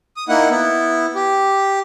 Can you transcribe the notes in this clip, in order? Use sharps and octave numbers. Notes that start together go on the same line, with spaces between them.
D#6
A#3 D#4 E4 F#5
B3 E4
G4